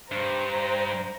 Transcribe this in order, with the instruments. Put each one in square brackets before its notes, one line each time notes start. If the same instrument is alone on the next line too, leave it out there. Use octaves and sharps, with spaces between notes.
[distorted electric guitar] G2 [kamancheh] C5 A#5